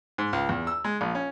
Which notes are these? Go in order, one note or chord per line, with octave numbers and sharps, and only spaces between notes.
G#2
C#2
E2
E6
G#3
A#1
C#4